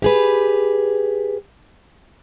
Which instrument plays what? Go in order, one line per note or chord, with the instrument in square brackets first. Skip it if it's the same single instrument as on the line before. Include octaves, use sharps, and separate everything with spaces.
[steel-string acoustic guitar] G4 G#4 B4